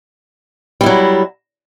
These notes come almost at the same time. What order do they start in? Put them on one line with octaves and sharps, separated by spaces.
G3 E4 F#3